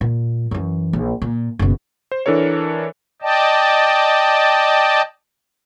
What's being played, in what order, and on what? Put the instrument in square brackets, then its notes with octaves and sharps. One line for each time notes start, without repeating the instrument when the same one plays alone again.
[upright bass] A#2
F#2 E3
A#1
A#2
F#1 B2
[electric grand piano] C5
E3 D4 A4 A#4 C#5
[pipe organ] D5 D#5 G5 A5